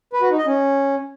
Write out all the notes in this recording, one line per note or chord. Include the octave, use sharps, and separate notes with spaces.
B4
F#4
D#4
D#5
C#4